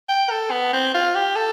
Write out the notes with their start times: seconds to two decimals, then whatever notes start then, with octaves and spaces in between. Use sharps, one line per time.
0.09 G5
0.30 A4
0.51 B3
0.73 C4
0.94 F4
1.15 G4
1.36 A4